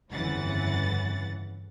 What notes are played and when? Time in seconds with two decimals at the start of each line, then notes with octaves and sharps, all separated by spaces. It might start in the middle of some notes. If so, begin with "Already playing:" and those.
0.11 G1 F2 C#3 E3 F#5 A6